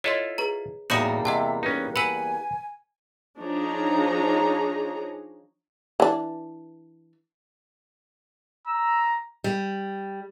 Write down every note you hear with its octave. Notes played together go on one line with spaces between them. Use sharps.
E4 F4 A4 C#5 D#5 C6
G#4 B4 A#5
E2 A2 G3 A#3 D#4 F#4 D#6 F#7
C3 D#5 E5 F#5 A5
C#4 D#4 B4
B4 F#5 G#5 B5 E6 F#7
F3 D4 D#4 G#4 C#5 A#5
E3 D4
A#5 E6
G3